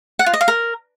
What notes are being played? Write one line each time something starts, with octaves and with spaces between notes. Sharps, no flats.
F#5
F4
D#5
F5
A#4